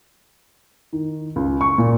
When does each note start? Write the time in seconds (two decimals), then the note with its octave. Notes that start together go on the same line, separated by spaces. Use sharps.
0.93 D#3
1.36 C#2
1.61 C#6
1.78 A#2